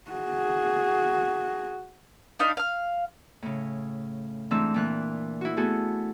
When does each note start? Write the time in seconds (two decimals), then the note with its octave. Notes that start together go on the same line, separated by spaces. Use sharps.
0.10 F#4 G#4
2.39 D4 D#4 F5 B5
2.57 F5 F6
3.42 A2 C#3
4.51 G#2 E3 A3 C4 D4 E6
4.74 A#2 E3 F#6
5.41 E4 F#4
5.57 A3 B3 F#4 G#4 A4